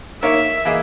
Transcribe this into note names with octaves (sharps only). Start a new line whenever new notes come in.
A#3 D#4 A#4 C#5 E5
E3 A#3 E4 G#4 D#5